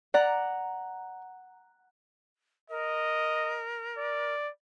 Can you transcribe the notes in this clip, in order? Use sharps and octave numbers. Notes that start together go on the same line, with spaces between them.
D5 F#5 A#5
A#4 D#5
D5